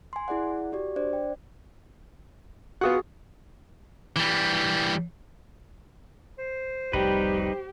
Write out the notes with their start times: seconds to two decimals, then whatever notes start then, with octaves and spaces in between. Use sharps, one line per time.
0.13 G#5 C6
0.28 E4 G#4 D5 F#5
0.72 F#4 G4 D5
0.96 D4 C5 D5
1.13 G5
2.81 B3 F4 F#4 G#4 F#5
4.16 E3 G3
6.39 C5
6.93 F1 C2 G3 D#4 G4 B4